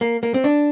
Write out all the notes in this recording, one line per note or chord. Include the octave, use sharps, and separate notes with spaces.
A#3
A#3
C4
D4